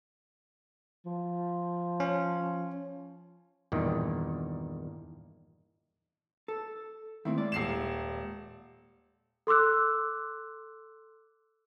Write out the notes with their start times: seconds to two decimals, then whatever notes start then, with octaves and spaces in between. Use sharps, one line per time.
1.06 F3
2.00 C#4
3.72 E2 G2 A#2 D#3
6.48 A4
7.25 D#3 A3 C4 E4
7.38 G#3 D5
7.52 D#1 C7 E7
9.47 A4 C6 D6 E6 F#6